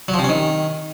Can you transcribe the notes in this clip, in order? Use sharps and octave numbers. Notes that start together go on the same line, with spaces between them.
F#3
F3
C3
C#4
D#3